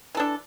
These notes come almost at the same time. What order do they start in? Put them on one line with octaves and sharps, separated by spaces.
E3 A4 D4